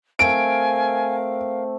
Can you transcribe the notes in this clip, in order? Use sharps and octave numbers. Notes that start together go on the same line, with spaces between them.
A3 C4 A#4 F5 G#5 D7